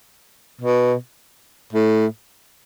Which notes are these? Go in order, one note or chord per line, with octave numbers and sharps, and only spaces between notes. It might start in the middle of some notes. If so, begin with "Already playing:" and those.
B2
A2